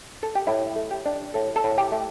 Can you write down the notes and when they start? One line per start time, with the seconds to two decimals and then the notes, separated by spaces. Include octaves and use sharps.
0.23 A4
0.35 G4
0.47 A2 E4
0.76 A3
0.91 G4
1.06 D4
1.34 A2 A4
1.56 A4
1.64 A2
1.78 G4
1.92 A3